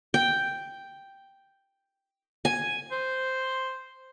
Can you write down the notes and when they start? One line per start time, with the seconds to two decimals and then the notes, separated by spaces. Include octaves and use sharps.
0.14 G5
2.45 G#5
2.92 C5